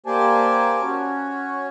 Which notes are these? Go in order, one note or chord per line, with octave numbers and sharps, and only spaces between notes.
A#3 G4 C5 D5 G#5 A5
C#4 F#4 C#5